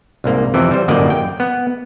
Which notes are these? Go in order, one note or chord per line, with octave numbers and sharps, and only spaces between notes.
C2 G#2 A#3
F2 C3 E3
G3 C5
G1 F#2 A2 A#3 D5 D#5
G5
B3